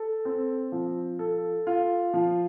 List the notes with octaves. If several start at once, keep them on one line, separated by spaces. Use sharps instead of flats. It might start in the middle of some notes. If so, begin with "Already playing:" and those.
Already playing: A4
C4
F3
A4
F4
F3